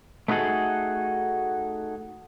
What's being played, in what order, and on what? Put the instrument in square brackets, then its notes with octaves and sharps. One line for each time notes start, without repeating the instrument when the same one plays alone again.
[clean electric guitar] A3 B3 D#4 F#4 G#4 A4